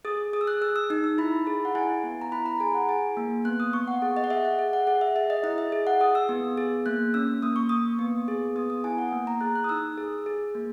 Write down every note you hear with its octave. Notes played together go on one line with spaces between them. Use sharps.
G#4 D#6
G#4 D#6
E6
F#6
G#4 E6
E6
D#4 E6
E6
E4 B5
G#4
F#5
E4 G#5
B3
A#5
E4 B5
A#5
G#4 G#5
F#5
G#4 G#5
A#3
B3 F#6
D#6
B3 C#6
F#5
G#4 F#5
D#5
F#5
G#4 E5
F#5
G#4
F#5
G#4 F#5
E5
G#4 E5
D#5
E4 D#5
E5
G#4
F#5
G#4 D#6
E6
B3
G#4
A#3 F#6
C#4 E6
A#3 D#6
C#6
A#3 D#6
B3
G#4
B3 D#6
D#6
E4 G#5
F#5
A#3
A#5
G#4 F#6
F#6
D#6
D#4 E6
G#4
G#4
A#3